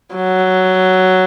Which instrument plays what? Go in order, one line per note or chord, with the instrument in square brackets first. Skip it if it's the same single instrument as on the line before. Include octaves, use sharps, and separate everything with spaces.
[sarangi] F#3